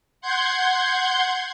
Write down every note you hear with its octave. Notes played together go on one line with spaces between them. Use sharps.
F#5 C6 G6 G#6